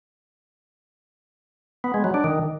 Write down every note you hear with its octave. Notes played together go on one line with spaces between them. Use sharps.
B3
G#3
F#3
D4
D#3